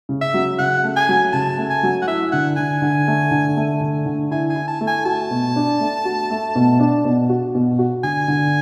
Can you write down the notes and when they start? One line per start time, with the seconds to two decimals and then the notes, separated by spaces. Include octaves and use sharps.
0.09 C#3
0.21 E5
0.34 F#3
0.59 C#3 F#5
0.84 A3
0.96 G#5
1.09 F#3
1.33 C#3 A5
1.58 A3
1.70 G#5
1.83 F#3
2.02 F#5
2.08 E4 E5
2.32 D3 F#5
2.57 D3 G#5
2.82 D3
3.08 A3
3.31 D3
3.57 A3
3.81 D3
4.06 D3
4.31 E4 G#5
4.50 G#5
4.56 E4
4.68 A5
4.81 A3
4.87 G#5
5.05 F#4 A5
5.31 B2
5.56 D4
5.80 A3
6.05 F#4
6.30 A3
6.55 B2
6.79 D4
7.05 B2
7.29 F#4
7.55 B2
7.79 F#4
8.03 D3 G#5
8.28 D3